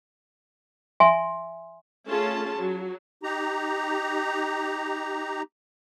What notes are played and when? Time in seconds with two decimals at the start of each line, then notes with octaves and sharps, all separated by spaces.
1.00 E5 G#5 C6
2.06 A3 C#4 F4 G#4 A5
2.56 F#3
3.23 D#4 G4 A#5